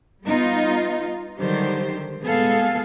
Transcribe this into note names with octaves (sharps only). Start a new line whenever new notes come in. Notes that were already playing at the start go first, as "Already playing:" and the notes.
G3 B3 D#4 F4
D3 D#3 F#3 G3 G4 C5
A#2 G#3 B3 G#4 A4 F5